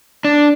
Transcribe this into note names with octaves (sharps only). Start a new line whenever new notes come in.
D4